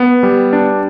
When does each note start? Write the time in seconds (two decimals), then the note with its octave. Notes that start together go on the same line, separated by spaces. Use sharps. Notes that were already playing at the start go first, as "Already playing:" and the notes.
Already playing: B3
0.23 G3
0.53 D4